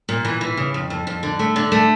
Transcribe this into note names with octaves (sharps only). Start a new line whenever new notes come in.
A#2
E3
E3
C#3
F2
F2
F2
D3
A3
D3
A3